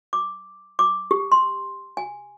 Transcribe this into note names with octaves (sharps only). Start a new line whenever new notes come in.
D6
D6
G4
C6
G#5